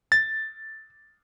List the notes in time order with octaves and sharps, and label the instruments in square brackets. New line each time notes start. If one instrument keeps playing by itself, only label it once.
[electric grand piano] A6